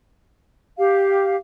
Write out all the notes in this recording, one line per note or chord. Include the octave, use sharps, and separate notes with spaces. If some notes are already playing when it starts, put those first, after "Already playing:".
G4 F5